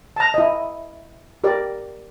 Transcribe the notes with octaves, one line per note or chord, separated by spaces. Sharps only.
A5 A#5
E4 D#5
G4 A#4 D5